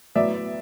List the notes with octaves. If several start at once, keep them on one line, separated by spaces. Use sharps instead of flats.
A2 F#3 B3 D5 E5